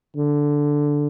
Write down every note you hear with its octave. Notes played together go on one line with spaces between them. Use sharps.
D3